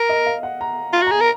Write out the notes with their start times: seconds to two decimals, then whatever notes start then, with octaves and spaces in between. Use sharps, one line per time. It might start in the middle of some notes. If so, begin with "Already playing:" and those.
Already playing: A#4
0.09 D#5
0.26 F5
0.43 F#5
0.61 A#5
0.93 F4
1.02 F#4
1.07 A#5
1.11 G#4
1.21 A#4